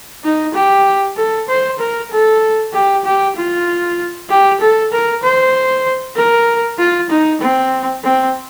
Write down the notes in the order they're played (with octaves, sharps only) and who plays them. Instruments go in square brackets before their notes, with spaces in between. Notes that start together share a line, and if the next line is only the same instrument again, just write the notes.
[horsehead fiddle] D#4
G4
A4
C5
A#4
A4
G4
G4
F4
G4
A4
A#4
C5
A#4
F4
D#4
C4
C4